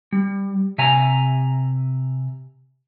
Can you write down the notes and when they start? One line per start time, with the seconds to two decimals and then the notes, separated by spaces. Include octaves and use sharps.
0.12 G3
0.78 C3 E5 G#5 A#5